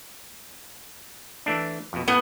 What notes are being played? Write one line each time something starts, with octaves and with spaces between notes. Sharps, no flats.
E3 A3 D4
F2 B2
A2 B3